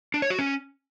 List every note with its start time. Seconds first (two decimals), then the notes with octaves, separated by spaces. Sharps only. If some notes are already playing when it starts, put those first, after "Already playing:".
0.14 D4
0.22 C#5
0.30 F#4
0.39 C#4